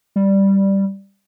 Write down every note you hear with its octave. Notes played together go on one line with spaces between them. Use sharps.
G3